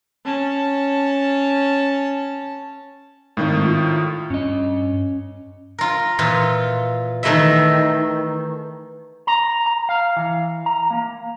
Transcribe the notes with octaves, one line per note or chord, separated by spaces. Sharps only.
C#4 A5
G#1 A2 D#3
E4 F4
G2 C#4 D#5
F4 A#4
A#2 E3 F4 F5 C6
D#3 E3 A3 E4 D#5 E5
A#5
A#5
F5
E3
A#5
A#3